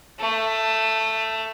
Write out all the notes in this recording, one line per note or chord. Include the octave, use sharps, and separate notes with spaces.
A3